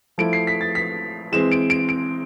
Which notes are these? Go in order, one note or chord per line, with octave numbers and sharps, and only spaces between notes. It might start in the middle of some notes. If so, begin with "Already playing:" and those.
F3 A3 E4 D7
C7
B6
A6
B6
E3 G#3 C4 E7
D7
D7
D7